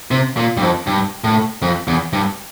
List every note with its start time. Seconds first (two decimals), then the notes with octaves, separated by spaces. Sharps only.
0.11 C3
0.37 A#2
0.57 G2
0.62 F2
0.87 G2
1.24 A2
1.62 F2
1.88 E2
2.13 G2